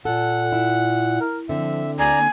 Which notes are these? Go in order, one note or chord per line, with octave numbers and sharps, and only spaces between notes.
A#2 A4 F#5
E4
A#4
D3 F3 C4 E5
D2 D5 G#5 A#5
A#3